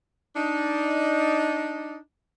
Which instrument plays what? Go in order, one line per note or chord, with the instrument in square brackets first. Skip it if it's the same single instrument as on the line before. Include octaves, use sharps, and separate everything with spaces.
[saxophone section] D4 D#4